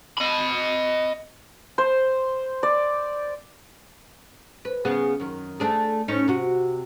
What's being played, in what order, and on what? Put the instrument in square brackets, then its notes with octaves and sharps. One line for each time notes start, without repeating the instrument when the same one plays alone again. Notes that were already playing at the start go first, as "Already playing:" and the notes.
[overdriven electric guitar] D#5 B5
[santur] C5
D5
[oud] B4
C#3 B3 G#4
F#2 D#3
A3 D4 G#4
A2 C#4 D#4
C3 F#4